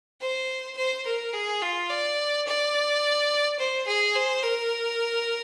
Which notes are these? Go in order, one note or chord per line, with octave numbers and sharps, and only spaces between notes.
C5
C5
A#4
G#4
F4
D5
D5
C5
G#4
C5
A#4